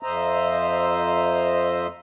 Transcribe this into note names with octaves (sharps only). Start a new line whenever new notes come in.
F2 C5 D#5 E5 A#5